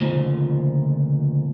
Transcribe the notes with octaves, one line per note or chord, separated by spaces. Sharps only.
D2 A#2 C#3 F3